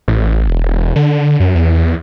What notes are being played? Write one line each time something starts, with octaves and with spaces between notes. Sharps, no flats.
A1
E1
D3
F#2
E2